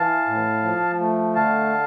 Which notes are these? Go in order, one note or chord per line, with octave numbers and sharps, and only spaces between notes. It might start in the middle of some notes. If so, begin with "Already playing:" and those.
Already playing: E3 F5 A5
A2
F3
A3
D3 F5 A5